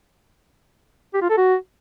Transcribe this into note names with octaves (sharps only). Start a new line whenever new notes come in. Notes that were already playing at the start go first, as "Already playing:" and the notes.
G4
F4
A4
F#4